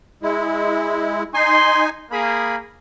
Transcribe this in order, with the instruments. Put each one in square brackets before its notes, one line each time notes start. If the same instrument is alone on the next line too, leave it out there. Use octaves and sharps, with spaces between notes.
[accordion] G#3 E4
[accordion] D#4 G#5 [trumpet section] C6
[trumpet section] A#3 G#4 [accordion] B5